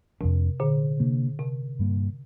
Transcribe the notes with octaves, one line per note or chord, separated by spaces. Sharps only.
F2 C3 F3 D4
A#2 D3
C3 A#3 D4
C3
G2 G3 A#3